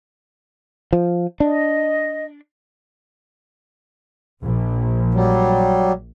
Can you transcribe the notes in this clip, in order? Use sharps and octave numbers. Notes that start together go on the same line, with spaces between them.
F3
D4 D#5
A#1
F#3 G3